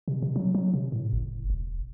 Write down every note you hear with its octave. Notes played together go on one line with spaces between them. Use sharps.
C3
C3
F#3
F#3
C3
A2
F#1
E1